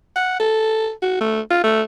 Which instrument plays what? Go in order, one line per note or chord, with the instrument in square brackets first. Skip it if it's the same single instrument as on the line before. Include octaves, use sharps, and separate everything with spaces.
[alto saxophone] F#5
A4
F#4
A3
F4
A3